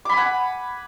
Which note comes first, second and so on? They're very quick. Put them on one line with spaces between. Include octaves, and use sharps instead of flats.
D6 B5 G#5 F#5